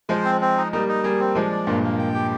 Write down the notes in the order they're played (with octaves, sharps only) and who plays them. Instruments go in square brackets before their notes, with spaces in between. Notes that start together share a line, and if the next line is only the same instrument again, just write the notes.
[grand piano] F3 G#3 [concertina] C5
[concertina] C4
C4
D#4
[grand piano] G3 A#3 [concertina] D#4
[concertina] D#4
[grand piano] G3 A#3 [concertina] G#4
[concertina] C4
[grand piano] F3 G#3 [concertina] D4
[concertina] D5
[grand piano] G2 A#2 [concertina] A#3
[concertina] A#3
G5
G4